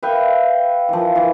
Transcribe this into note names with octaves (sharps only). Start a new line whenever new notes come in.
B4 E5 F5 G5
E3 F3
E3